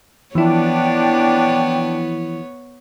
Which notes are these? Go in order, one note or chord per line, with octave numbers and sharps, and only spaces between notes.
E3 F3 B3 D4 E4 C#5 G5